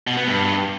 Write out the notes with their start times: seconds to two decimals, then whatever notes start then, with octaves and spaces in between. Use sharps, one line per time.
0.07 B2
0.17 B3
0.27 G2